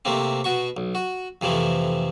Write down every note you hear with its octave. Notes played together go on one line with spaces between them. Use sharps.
C3 A3 A#3 C4
B2 F#4 C#6
B1
F#4
F2 C3 E3 F3 A3